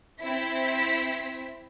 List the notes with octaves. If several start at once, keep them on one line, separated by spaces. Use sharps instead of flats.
C4 E4 B6